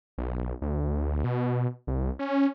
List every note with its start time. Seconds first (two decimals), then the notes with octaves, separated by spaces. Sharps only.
0.18 B1
0.62 D2
1.24 B2
1.87 C2
2.19 C#4